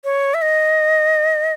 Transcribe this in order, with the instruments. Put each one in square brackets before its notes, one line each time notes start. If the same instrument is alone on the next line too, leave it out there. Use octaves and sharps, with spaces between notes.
[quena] C#5
E5
D#5